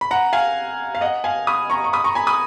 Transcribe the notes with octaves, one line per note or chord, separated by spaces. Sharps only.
B5
F#5 A#5
F5 G#5
F5
D#5 F#5
F5 G#5
B5 D#6
A#5 C#6
C#6
B5 D#6
A#5 C#6
G#5 B5
B5 D#6